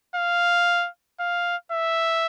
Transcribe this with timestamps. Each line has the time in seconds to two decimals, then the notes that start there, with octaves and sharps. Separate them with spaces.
0.16 F5
1.20 F5
1.72 E5